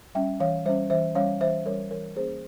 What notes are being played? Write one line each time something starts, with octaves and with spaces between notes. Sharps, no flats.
G3 C#4 E5 G5
E3 C#5 F5
G3 C#4 C5 E5
E3 C5 E5
G3 C#4 C#5 F5
E3 C5 E5
G3 C#4 A#4 C#5
E3 A#4 C#5
A#3 C#4 G#4 C5